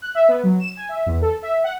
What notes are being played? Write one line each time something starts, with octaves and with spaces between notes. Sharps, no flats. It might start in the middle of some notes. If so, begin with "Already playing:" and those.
F#6
E5
B3
F#3
E7
G#5
E5
E2
A4
E5
F#5